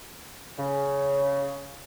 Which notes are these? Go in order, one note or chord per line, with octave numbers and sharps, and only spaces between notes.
C#3